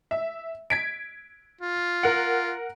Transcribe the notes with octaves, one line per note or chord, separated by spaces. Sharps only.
E5
G#6 B6 D7
F4
A#4 F#5